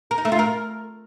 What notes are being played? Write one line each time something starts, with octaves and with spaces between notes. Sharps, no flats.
A#4
D#4
A3
F4
A#4